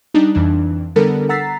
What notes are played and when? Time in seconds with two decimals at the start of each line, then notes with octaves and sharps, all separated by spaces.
0.14 G3 D4 D#4
0.35 F2 E3 D4
0.96 D3 G3 B3 D4 A4 A#4
1.29 F#5 A#5 E6 A6 B6 C7